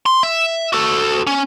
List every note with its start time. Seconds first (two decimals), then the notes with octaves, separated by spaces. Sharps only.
0.06 C6
0.23 E5
0.73 F#4 A4
1.27 C#4